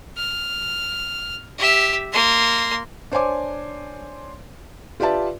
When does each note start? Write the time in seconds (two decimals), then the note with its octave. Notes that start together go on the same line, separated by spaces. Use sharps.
0.17 F6
1.58 G4 E5
2.13 A#3 C6
3.12 D4 C5 C#5 G#5 D6
5.00 F4 G4 B4 D5 E5 A5